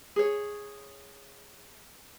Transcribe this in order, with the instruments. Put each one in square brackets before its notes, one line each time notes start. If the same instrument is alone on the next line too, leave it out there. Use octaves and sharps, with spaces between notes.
[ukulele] G#4 C#5